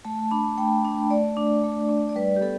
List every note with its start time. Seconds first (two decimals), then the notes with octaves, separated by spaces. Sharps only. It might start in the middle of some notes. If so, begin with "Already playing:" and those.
0.05 A3 A5
0.19 A5
0.31 D4 B5
0.58 A3 G5
0.85 D4
1.10 A3 D5
1.37 D4
1.64 A3
1.89 D4
2.09 D5
2.16 G3 B4
2.36 G4
2.41 B3 A4